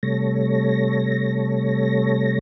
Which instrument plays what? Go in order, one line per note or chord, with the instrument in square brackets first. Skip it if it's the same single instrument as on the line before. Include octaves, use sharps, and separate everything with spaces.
[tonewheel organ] C3 G3 A3 A4 C#5 A#6